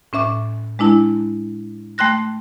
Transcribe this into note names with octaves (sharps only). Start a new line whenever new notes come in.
A2 C#4 E5 D6
G#3 D4 E4 A5
A3 G5 C6 F#6 A#6